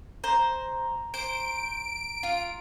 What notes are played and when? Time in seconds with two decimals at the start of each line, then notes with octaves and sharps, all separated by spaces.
0.24 C5 A#5
1.14 C5 D7
2.23 F4